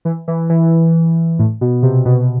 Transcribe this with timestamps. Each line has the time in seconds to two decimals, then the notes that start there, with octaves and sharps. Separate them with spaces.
0.05 E3
0.28 E3
0.50 E3
1.39 A2
1.61 B2
1.82 C3
2.05 B2